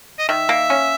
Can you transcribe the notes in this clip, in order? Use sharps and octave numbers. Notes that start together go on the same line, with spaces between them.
D#5
D#3 E5
A#3
C#4